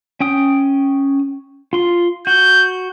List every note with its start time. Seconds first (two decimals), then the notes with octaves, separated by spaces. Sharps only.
0.20 C#4 G5 D#6
1.73 F4 C6
2.27 F#4 G6